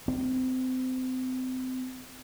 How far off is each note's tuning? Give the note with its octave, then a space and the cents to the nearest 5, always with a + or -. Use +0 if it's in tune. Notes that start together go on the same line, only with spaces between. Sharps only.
C4 -30